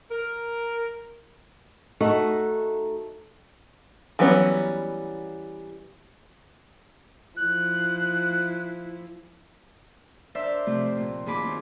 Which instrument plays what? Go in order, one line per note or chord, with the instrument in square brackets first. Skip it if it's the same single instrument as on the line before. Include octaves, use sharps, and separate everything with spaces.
[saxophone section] A#4
[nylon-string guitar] A3 D#4 F#4
[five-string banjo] E3 F#3 G3 B3 C#4
[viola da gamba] F3 E4 [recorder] F#6
[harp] D4 A#4 C5 D5 E5
F2 C3 A3 C4
A#2
D#2 F4 G#4 B5 D6
C4 C#4 F4